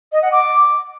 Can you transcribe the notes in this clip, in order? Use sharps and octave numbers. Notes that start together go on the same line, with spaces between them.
D#5
F#5
D6